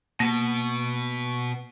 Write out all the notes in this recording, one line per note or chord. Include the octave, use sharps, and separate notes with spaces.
B2 A#3 B3